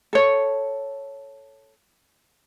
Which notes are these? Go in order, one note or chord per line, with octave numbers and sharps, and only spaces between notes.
A4 C#5